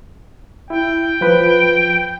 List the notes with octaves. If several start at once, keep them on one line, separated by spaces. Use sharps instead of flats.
E4 G5
F3 B4